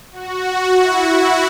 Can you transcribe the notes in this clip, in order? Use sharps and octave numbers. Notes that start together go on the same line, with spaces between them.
F#4
E4